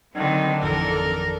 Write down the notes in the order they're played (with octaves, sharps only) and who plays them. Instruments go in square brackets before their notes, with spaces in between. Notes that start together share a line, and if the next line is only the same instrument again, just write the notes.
[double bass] D3 D4 [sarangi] D#3 [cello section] F#3 C4
[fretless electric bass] G#1 F2 E3 [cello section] A4 D5 [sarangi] A#4